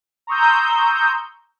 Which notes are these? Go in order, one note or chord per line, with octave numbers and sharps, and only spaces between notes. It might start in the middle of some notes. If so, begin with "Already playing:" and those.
A#5 C6 C#6 D#6 E6 G6